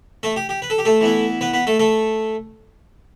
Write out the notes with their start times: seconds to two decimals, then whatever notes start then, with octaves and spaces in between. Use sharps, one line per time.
0.23 A3 A4
0.36 G4
0.49 G4
0.62 B4
0.70 A4
0.78 G4
0.85 A3 A4
1.01 E3 B3 E4
1.41 B3 B4
1.53 B3 B4
1.67 A3 A4
1.79 A3 A4